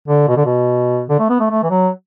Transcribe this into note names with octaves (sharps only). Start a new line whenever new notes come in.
D3
B2
D3
B2
D3
A3
B3
A3
A3
E3
F#3